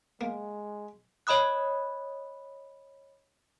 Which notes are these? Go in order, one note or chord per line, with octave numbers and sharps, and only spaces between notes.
G#3 A#3
C#5 D#5 B5 D#6 F#6